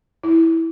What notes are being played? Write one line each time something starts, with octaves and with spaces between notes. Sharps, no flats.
E4